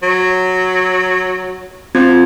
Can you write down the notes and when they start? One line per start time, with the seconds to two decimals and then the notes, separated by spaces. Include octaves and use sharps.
0.03 F#3
1.95 F3 C4 F4 G#6